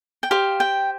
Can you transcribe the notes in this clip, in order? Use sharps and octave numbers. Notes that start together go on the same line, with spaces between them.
G5
G4 C5 F5
G5